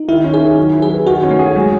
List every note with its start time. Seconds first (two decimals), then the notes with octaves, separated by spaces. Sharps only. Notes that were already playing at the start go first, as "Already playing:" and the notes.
Already playing: D#4
0.08 D#3 E4
0.24 C#4
0.34 G#4
0.42 D#3
0.58 F#3
0.74 E4
0.82 G#4
0.90 B4
1.07 D#3 F#4
1.23 C#4
1.31 A3
1.39 G#4
1.56 F#3 G#3